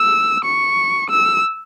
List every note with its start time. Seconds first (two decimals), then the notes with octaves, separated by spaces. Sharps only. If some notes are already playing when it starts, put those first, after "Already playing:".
Already playing: E6
0.45 C#6
1.10 E6